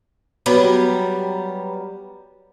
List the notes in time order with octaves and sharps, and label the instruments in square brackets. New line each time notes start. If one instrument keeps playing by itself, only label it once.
[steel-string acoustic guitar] F#3 G3 B3 G4 A#4